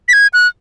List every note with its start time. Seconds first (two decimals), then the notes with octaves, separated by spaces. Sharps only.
0.08 B6
0.13 G#6
0.33 F#6